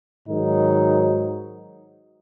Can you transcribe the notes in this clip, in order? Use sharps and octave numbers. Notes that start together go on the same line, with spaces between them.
G#2 D#3 F#3 D#4